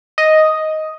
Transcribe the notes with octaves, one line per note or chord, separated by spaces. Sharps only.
D#5